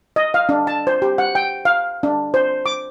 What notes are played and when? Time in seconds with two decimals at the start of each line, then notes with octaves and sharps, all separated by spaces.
0.16 D#5
0.34 F5
0.49 D4
0.67 A5
0.87 C5
1.02 G4
1.18 F#5
1.35 G5
1.65 F5
2.03 D4
2.34 C5
2.66 D6